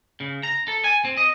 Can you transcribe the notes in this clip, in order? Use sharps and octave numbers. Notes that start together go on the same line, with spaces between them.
C#3
A#5
A4
G#5
C4
D#5